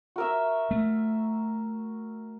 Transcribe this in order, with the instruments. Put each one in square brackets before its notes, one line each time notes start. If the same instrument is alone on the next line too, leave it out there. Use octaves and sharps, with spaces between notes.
[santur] F#4 A#4 E5
[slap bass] A3